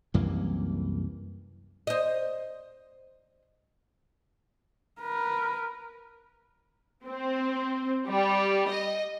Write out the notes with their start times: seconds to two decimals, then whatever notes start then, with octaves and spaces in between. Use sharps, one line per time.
0.14 C2 F#2 E3 A#3
1.87 C5 D#5
5.01 A#4 B4
7.06 C4
8.09 G3
8.71 D#5